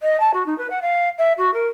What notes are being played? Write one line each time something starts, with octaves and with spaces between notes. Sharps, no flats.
D#5
A5
F#4
D#4
B4
F#5
F5
E5
F#4
A#4